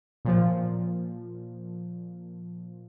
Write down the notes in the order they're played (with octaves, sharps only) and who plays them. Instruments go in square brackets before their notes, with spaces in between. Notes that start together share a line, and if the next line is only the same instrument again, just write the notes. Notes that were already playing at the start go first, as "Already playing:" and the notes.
[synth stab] A#2 F3